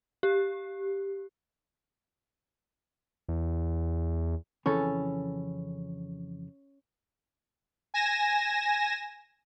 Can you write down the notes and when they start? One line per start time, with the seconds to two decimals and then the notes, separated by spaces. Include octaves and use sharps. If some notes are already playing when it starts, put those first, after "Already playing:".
0.23 G4
3.28 E2
4.66 F2 C#3 E3 C#4 A4
7.94 G#5 A#6 E7